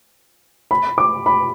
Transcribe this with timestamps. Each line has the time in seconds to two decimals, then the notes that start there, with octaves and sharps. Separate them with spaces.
0.71 B5
0.98 D6
1.26 B5